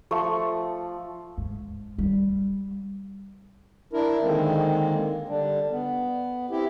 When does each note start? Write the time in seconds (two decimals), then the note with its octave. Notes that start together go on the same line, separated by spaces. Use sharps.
0.11 F3 A3 C#6
1.38 G#2
1.99 G3
3.93 D4 E4 A#4
4.22 D3 D#3 G#3 A#3 C4
5.28 D3 G3 D4
5.70 B3
6.51 C4 E4 G4